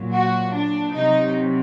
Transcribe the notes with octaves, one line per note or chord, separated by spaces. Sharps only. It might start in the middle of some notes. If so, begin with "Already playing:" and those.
Already playing: A#2 F#3
F#4
D4
C3 F#3 D#4